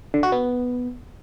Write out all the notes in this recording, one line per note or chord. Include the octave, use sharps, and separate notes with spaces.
D3
F#4
B3